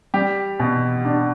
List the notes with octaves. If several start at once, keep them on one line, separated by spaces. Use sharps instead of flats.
G3 G4
B2
D4